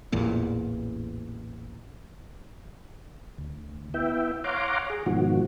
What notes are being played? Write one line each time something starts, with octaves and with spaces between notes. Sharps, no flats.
A1 E2 A#2
D2
B3 E4 E5 G5
C#5 F5 F#5 A#5 C6 D6
G#4
G#2 B2 D#3 F3 F#4